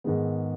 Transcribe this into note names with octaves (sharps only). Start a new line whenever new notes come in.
G#2 D#3 G#3 B3